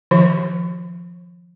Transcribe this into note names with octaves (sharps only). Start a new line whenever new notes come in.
D#3 F3 C#6